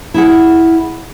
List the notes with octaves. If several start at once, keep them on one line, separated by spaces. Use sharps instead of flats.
E4 G#4 F#5